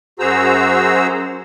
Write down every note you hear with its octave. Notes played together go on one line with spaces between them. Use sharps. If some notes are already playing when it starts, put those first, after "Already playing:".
F#2 F#4 G#4 C5 A#5 E6